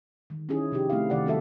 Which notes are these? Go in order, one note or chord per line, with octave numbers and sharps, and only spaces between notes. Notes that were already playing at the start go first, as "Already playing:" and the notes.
D#3 G#3
C#4 D#4 E4 G#4
C3 F3 D4 D#4 G4
A3 C4 E4 F5
C3 D#3 D5 F#5
G3 C4 F#4 A4 E5